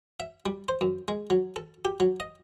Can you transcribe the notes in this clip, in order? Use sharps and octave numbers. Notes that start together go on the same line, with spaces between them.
E5
G3
C5
F#2
G#3
F#3
A4
G4
F#3
D#5